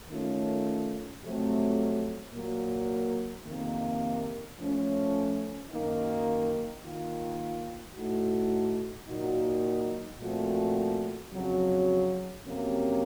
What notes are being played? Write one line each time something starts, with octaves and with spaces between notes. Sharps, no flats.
D#3 A3 C#4 F4
F2 C3 F#3 A3 C4
A#2 F#3 A#3
F2 C3 D#3 A#3
F3 A3 C#4
F#2 D#3 A#3 D#4
D#3 A#3 F4
A2 A3 D#4 F#4
A#2 F#3 A#3 D#4 F#4
A#2 F3 A3 C4 F#4
F2 C#3 F#3
F2 C3 F#3 A#3 C#4